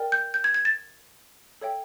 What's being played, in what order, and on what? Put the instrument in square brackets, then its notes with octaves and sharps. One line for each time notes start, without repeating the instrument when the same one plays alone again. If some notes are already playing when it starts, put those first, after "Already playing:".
Already playing: [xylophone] A#4 D5 G5
G6
G6
G#6
G#6
A6
A4 C#5 E5 G5